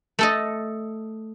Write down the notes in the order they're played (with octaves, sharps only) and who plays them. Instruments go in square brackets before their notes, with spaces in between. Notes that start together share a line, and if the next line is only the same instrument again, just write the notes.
[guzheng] A3 A4 D#5